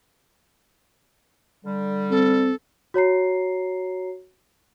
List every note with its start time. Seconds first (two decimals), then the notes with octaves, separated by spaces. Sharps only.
1.64 D3 G3
2.11 C4 A4
2.94 F#4 C#5 A#5 C7